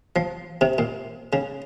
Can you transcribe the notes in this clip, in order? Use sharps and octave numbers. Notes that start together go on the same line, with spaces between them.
F3
C3
A#2
C#3